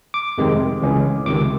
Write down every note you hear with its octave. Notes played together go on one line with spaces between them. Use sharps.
D6
F2 C3 D#3 G#3 C4
C#2 C#3 E3 G#3 C#4
C#2 C3 D#3 D6